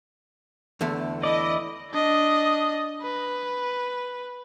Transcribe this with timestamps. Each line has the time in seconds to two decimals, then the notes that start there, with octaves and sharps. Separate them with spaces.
0.81 E2 D3 A3
1.23 E4 D5 D#5
1.91 D4 D#5
3.02 B4